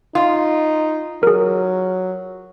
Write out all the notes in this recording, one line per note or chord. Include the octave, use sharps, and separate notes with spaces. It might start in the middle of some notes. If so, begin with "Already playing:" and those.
D#4 F4
F#3 G#4 A#4